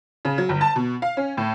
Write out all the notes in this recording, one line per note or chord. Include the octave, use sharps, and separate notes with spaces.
C#3
F#3
G1
A5
B2
F5
C#4
A2